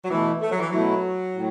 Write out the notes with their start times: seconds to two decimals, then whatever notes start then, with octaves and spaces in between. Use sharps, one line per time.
0.05 F#3
0.10 B2 E3 A3 E4
0.41 A3
0.51 F#3
0.60 E3
0.70 B2 F#3 A3 E4
1.35 A2